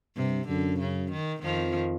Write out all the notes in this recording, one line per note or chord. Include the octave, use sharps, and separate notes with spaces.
G2 C3
F#2 D3
C#3
D#3
F2 D#3 F3